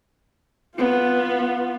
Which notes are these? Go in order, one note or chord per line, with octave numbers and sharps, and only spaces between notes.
B3 F4